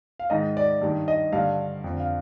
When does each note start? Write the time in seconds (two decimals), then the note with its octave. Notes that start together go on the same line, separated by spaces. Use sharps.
0.20 F5
0.30 G#2 D#3 D#5
0.57 D5
0.82 G2 D#3
1.08 D#5
1.33 G2 D3 F5
1.84 F2 D3
2.00 F5